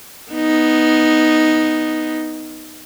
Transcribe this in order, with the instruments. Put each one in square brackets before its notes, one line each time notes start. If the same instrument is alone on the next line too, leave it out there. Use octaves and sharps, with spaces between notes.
[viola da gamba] B3 D#4